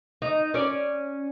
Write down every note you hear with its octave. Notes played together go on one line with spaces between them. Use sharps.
D#4
C#4 D5